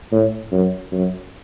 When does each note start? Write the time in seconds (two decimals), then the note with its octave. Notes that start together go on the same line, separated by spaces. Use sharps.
0.12 A2
0.52 F#2
0.92 F#2